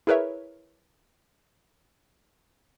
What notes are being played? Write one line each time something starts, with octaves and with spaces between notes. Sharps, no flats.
E4 G#4 A#4 B4 C#5 E5